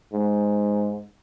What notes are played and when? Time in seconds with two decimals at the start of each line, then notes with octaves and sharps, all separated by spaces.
0.13 G#2